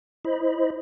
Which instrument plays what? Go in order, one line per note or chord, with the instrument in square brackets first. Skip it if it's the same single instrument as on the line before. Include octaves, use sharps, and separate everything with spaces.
[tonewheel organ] E4 C5 D#5 B5